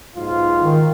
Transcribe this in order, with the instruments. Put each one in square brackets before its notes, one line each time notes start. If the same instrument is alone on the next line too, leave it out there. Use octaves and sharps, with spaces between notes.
[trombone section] B1 G#2 F4
[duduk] D#3